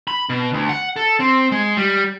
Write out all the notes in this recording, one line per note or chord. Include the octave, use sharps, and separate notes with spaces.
B5
B2
D2
F#5
A4
C4
G#3
G3